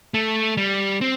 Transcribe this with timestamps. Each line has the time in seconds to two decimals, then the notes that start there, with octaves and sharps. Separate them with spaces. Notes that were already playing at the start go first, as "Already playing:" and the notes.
0.14 A3
0.57 G3
1.01 C4